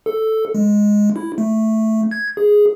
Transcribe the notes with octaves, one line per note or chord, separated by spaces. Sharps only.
A4
G#3
E4
A3
G#6
G#4